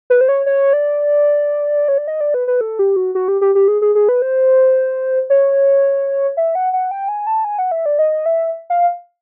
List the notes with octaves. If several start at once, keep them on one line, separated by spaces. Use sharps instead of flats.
B4
C5
C#5
C#5
D5
C#5
D5
D#5
D5
B4
B4
A4
G4
F#4
F#4
G4
G4
G4
G#4
G#4
G#4
B4
C5
C#5
E5
F#5
F#5
G5
G#5
A5
G#5
F#5
E5
D5
D#5
E5
F5